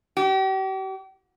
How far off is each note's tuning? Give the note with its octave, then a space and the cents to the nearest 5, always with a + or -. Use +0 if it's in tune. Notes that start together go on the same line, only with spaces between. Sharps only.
G4 -40